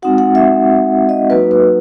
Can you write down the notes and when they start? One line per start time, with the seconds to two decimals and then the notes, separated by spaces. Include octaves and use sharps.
0.02 G#3 C4 D#4 F#4 F#5
0.18 F#5
0.35 E5
1.09 D#5
1.30 F#3 A#3 D#4 F#4 B4
1.51 B4